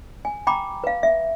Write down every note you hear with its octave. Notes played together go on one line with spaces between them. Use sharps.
G#5
G5 A#5 B5 D6
B4 F5
E5